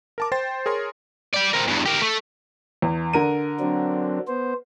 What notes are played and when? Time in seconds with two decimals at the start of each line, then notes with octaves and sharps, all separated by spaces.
0.18 A#4 A5 D6
0.32 C5 G5 C6 A6
0.66 G#4 A#4 C#5 C6
1.34 D5 G5
1.54 C4 A#4
1.68 E2 G2
1.86 G4 A#4
2.02 A3
2.82 E2
3.13 D3 A#4 D#7
3.60 F#3 C4 D4
4.28 B3 C5